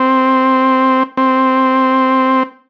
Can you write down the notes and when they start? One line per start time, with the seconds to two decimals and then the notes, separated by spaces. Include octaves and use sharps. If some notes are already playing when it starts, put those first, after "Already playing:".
Already playing: C4
1.17 C4